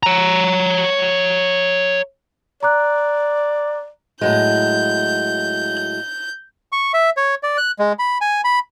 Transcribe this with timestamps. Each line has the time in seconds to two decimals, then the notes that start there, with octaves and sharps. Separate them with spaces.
0.03 C#5 A#5
2.63 D5 A#5 D6 F#6
4.21 A2 F#3 G#3 G6
6.72 C#6
6.94 E5
7.17 C#5
7.43 D5
7.57 F#6
7.79 G#3
7.99 B5
8.21 G#5
8.44 B5